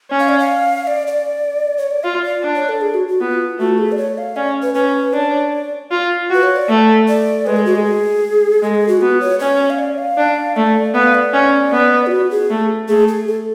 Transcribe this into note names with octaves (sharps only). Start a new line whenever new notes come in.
C#4
F5
D5
F5
D5
D5
C#5
D5
F4 F5
D5
D4
C#5
A4
G#4
F#4
F#4
B3 F4
A3 F#4
G#4
D5
C#5
F5
C#4 D5
B4
C#4 B4
D4 C#5
D5
F4
F#4 B4
C#5
D5
A3
D5
G#3 B4
A4
F#4
G#4
G#3 A4
G#4
F#4
F4
B3 F#4
C#5
C#4 C#5
F5
D5
F5
D4
A3 D5
B3 F5
D5
C#4
B3
F4
F#4
G#4
A3
A3 G#4
G#4
A4